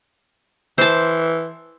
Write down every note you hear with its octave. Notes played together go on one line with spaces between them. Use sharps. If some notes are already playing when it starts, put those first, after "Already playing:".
E3 C5 A5